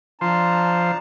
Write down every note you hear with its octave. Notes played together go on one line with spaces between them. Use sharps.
F3 D4 C5 A5 A#5